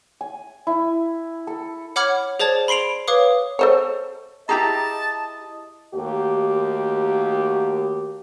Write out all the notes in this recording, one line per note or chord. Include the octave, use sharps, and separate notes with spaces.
G#5
E4
A4
C#5 F#5 B5 D6 F6 G#6
G#4 C5 D5 A5 G#6
B5 C6 C7 D7 F7
B4 C#5 F5 D6 D#6
A4 C5 C#5
E4 G4 G#4 D#5 A5 A#5
D#2 A3 D#4 F#4 G4